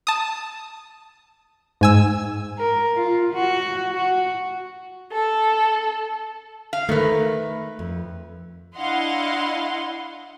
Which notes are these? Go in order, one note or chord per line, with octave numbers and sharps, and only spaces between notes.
A5 D#6
G#2 G#5 E6
A#4
F4
F#4
F#4
A4
F5
D#3 A3 A#4 B4
F2
D4 E4 D#5 F5 F#5 C6